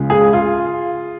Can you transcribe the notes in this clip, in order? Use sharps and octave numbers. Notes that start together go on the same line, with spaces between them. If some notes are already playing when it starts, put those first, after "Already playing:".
Already playing: C#2 C#3 G#3
G#4
F4